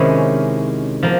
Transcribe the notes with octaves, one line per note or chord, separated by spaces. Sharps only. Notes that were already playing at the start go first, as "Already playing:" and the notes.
Already playing: C3 D#3 G#3 C#4 E4
F3 A#3